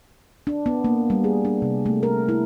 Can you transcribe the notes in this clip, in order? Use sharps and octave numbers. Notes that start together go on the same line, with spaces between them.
D4
B3
A#3
G3
G#4
D4
C3
A3
A#4
E4